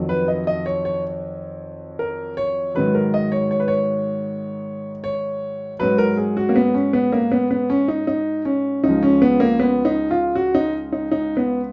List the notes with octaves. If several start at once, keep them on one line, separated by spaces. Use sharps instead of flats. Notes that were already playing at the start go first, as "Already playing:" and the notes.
Already playing: F2 D#3 F#3
B4
D#5
D#5
C#5
C#5
A#4
C#5
G#2 D#3 F#3 B4
A#4
D#5
C#5
C#5
B4
C#5
C#5
G#2 F#3 B4
A#4
G#4
F#4
A#3
B3
C#4
B3
A#3
B3
B3
C#4
D#4
D#4
C#4
C#2 C#3 F3 D#4
C#4
B3
A#3
B3
D#4
F4
F#4
D#4
D#4
D#4
B3